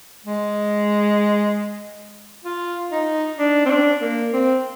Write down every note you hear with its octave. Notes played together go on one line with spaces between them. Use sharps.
G#3
F4
D#4
D4
C4
D4
A#3
C4